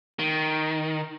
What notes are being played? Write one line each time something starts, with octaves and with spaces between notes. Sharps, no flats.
D#3